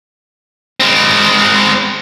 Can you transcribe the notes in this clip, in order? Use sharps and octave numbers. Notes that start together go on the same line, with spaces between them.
G#3 C4